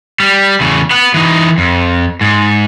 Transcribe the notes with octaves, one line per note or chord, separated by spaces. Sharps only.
G3
E2 C#3
B3 F#5
E3 D#4
F2
G#2